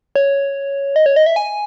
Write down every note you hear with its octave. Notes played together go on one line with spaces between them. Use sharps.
C#5
D#5
C#5
D#5
E5
G#5